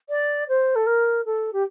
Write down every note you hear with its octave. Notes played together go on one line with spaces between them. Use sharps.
D5
C5
A4
A#4
A4
G4